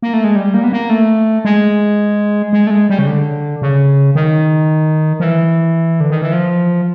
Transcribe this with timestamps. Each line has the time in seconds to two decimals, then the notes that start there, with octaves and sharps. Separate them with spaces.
0.02 A#3
0.13 A3
0.24 G#3
0.36 G3
0.54 A#3
0.64 B3
0.73 A#3
0.90 A3
1.45 G#3
2.53 G#3
2.67 A3
2.71 G#3
2.90 G3
2.99 C#3
3.07 D3
3.62 C#3
4.15 D#3
5.20 F3
5.24 E3
6.00 D3
6.11 D#3
6.22 E3
6.33 F3